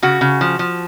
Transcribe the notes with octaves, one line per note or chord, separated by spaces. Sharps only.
C#3 F#4
C#3
F3
F3